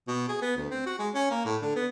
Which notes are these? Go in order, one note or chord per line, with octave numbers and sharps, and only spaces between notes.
B2
G#4
B3
D2
C4
F#4
G#3
C#4
A#3
A2
D3
B3